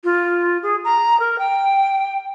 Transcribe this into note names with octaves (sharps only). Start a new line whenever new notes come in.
F4
G#4
A#5
A#4
G5